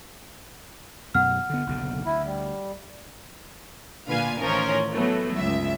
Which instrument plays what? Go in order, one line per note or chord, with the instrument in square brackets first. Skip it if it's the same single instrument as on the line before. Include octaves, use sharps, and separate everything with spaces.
[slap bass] F#2 B2 [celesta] F#5 F6
[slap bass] D3 B3
F#1 B1 D3
[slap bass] D2 [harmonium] E4
[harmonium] G3
[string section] A#2 D3 F4 B4 F5 G#5
A1 D#3 F3 C#4 A#4
E3 F#3 A3 B3
G1 C#2 E5